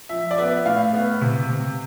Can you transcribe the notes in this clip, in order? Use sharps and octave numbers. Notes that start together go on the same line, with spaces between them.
F3 E5
D5
B3 E5
A2 F5
B3
C3
C3